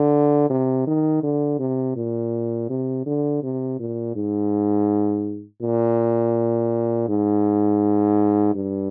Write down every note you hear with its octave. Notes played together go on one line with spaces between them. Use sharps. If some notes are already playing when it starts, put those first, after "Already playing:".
Already playing: D3
C3
D#3
D3
C3
A#2
C3
D3
C3
A#2
G#2
A#2
G#2
G2